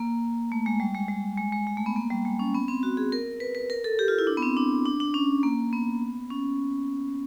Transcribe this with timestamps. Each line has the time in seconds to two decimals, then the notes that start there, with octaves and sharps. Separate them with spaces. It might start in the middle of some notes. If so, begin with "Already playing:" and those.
Already playing: A#3
0.52 A3
0.66 G#3
0.80 G3
0.95 G#3
1.09 G3
1.38 G#3
1.52 G#3
1.67 G#3
1.77 A3
1.86 B3
1.96 A#3
2.11 G3
2.25 G#3
2.39 C#4
2.54 B3
2.68 C4
2.83 F#4
2.97 G#4
3.12 A#4
3.40 B4
3.55 B4
3.70 A#4
3.84 A4
3.99 G4
4.08 F4
4.19 E4
4.27 D4
4.37 B3
4.42 C4
4.57 D4
4.86 D4
5.00 D4
5.14 C#4
5.43 A#3
5.73 B3
6.30 C#4